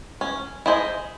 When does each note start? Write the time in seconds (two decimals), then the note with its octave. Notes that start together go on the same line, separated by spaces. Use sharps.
0.21 C#4
0.66 E4 G#4 C5 D#5